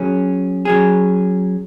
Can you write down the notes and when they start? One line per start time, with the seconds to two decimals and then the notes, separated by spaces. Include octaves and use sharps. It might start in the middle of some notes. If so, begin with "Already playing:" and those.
Already playing: F#3 C#4 G#4
0.65 F#3 C#4 G#4